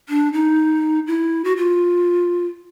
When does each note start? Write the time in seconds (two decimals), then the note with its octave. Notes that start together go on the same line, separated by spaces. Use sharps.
0.09 D4
0.33 D#4
1.07 E4
1.44 F#4
1.57 F4